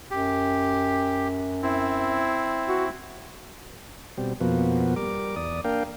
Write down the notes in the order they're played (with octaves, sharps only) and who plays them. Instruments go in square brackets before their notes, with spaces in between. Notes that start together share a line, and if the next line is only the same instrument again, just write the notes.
[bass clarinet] F#2 [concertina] G4
[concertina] C4 E4
[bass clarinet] F#4
[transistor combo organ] B2 G3 C4
F2 B2 F3 A#3 B3 F#4
G3 A#4 D6
E2 D5 D#6
A#3 D4 A#4 F5 G5